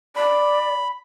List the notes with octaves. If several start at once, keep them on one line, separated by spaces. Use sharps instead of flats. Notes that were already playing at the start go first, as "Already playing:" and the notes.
D5 B5